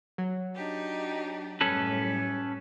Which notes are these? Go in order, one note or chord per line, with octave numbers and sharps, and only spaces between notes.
F#3
D4 D#4 G4
F#2 A2 G3 C#4 A4 B4